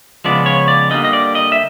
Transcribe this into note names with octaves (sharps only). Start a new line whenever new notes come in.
C#3 F3 G#3 B3 D5
C#5
D5
D3 G3 A#3 D#5
D#5
D5
D#5
E5